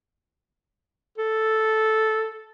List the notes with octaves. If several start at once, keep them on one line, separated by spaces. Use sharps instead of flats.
A4